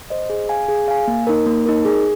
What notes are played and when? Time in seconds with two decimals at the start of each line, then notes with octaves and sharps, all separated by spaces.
0.10 C5 D#5
0.30 G#4
0.49 F5 G#5
0.68 G#4
0.88 F5 G#5
1.08 A#3
1.27 D#4 A#4
1.46 A#3
1.66 D#4 A#4
1.85 G#4